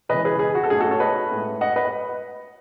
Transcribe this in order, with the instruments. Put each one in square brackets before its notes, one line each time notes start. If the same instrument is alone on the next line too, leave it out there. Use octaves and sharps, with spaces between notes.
[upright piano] E2 C#3 E3 G#3 B4 D#5
G#4 B4
G#4
F#4
A4
G#2 F#3 A3 G#4
F#4 A4
A4 C#5
B4 D#5
A2 G#3
D#5 F#5
B4 D#5